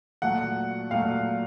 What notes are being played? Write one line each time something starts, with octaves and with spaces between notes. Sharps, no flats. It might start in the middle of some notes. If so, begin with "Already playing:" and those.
A#2 F#3 A3 F#5
A#2 F#3 A3 F5